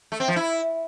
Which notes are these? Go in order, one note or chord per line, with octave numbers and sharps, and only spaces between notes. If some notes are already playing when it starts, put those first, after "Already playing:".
A3
C4
F3
E4